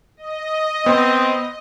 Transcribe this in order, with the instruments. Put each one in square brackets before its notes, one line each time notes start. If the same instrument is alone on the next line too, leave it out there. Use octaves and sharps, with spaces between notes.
[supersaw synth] D#5
[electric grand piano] B3 [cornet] C4